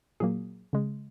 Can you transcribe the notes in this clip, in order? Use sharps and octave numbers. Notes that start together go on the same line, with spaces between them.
A#2 F#3 A#3 G#4
C#3 G#3